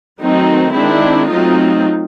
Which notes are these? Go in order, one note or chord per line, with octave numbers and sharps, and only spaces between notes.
D#3 F#3 A3 C4 D#4
D#3 G#3 C4 D4 E4
F#3 A3 C4 D#4 F4